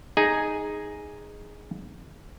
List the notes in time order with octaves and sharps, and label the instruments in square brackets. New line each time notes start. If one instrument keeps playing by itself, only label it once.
[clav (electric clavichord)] D#4 G#4 G#5